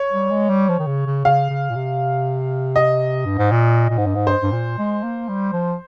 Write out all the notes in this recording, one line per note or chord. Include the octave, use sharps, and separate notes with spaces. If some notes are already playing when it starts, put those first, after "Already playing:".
Already playing: C#5
G3
G#3
G3
F3
D#3
C#3
C#3
C#3 F5
C#3
A#2
C3
D#5
G2
G#2
A#2
A#2
G#2
G2
G#2
G2 C5
G2
A#2
G#3
A#3
G3
F3